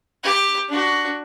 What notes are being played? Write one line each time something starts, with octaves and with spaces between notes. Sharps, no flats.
G4
D4 F#4